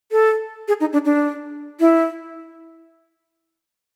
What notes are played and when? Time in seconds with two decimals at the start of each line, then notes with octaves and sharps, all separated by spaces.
0.12 A4
0.68 G#4
0.80 D#4
0.93 D4
1.05 D4
1.80 E4